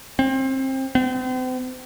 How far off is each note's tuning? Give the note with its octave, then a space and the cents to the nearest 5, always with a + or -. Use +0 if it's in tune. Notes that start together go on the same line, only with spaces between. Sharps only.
C4 +25
C4 -40